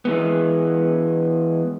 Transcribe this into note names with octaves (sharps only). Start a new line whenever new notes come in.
E3 G#3 B3